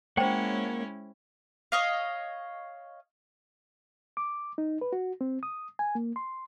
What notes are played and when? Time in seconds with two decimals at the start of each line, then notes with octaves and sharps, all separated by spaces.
0.17 G#3 A#3 C#4 E4 C5 C#5 F#5 G5
1.72 C#5 D#5 F5
4.17 D6
4.58 D#4
4.81 B4
4.93 F#4
5.21 C4
5.43 D#6
5.79 G#5
5.95 A#3
6.16 C6